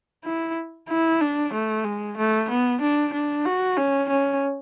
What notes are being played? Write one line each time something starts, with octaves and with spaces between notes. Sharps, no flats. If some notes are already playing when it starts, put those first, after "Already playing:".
E4
E4
D4
A3
G#3
A3
B3
D4
D4
F#4
C#4
C#4